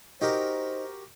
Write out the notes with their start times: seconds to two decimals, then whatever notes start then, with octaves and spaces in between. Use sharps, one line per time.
0.21 D#4 F#4 G4 A#4 C5